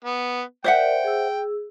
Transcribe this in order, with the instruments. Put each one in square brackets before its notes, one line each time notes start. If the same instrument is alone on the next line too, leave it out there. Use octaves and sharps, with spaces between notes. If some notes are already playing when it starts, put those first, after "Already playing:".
[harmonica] B3
[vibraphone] A#4 D5 [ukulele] C5 E5 F#5 [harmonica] G5
[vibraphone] G#4 E6